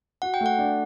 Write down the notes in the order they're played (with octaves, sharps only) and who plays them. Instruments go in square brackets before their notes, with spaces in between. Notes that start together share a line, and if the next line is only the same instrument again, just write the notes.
[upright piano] F#4 [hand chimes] F#5
[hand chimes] G5
[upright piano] A3
[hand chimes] F#5
[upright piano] D4